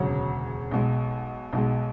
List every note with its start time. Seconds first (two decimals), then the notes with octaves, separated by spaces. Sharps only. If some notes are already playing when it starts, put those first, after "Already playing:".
Already playing: E1 D2 C#3 F#3 C#4
0.71 B1 B2 G#3
1.53 B1 B2 G#3